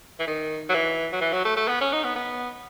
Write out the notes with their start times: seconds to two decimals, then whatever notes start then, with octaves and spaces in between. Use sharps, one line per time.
0.19 E3
0.27 D#3
0.69 F#3
0.74 E3
1.12 F#3
1.21 E3
1.32 F#3
1.45 A3
1.56 A3
1.68 B3
1.81 C#4
1.93 D#4
2.04 B3
2.16 B3